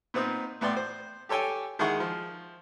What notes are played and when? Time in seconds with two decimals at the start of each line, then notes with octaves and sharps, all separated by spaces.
0.14 A#2 B3 C4 D#4
0.61 A2 B3 D5 G5 C6
0.76 C5
1.29 G4 A4 C#5 G5 G#5
1.79 D#3 G#3 E4 G#4 F#5 C#6
2.00 F3